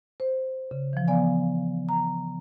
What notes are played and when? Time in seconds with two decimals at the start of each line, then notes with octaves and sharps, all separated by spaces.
0.20 C5
0.71 C#3
0.93 E3 F3
1.08 B3 D5 F5 G#5
1.89 A#5